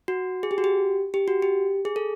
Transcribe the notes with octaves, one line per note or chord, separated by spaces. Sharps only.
F#4
G#4
G4
F#4
G4
G4
F#4
G4
G#4
A4